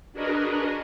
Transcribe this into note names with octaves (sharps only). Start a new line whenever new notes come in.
D4 F#4 G#4 A#4 B4 D#5